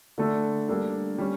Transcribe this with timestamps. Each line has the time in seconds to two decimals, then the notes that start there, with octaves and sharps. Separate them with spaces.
0.18 D3 A3 D4 A4
0.68 G3 A#3 D4 A4
1.18 G3 C#4